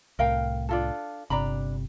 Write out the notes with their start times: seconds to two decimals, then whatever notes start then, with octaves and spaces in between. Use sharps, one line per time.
0.19 C2 A2 A#4 F5 G5
0.69 D4 F4 A4
1.30 G1 C3 D4 A#5 B5